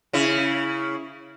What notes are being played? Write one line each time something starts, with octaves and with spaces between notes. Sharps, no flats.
C#3 E4